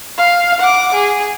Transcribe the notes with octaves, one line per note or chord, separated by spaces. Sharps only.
F5
F#5 D6
G#4